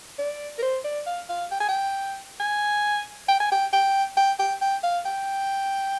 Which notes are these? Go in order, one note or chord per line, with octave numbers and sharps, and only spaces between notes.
D5
A#4
C5
D5
F5
F5
G5
G#5
G5
G#5
G5
G#5
G5
G5
G5
G5
G5
F5
G5